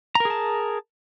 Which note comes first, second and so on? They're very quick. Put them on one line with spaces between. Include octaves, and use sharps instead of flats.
A#5 A#4 G#4 A5